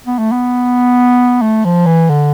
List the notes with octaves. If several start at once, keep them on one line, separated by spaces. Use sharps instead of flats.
B3
A3
B3
A3
F3
E3
D3